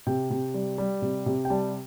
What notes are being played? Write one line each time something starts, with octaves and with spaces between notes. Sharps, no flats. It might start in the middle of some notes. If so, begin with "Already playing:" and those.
C3 G5
C3
G3
G3
C3
C3
G5
G3 A5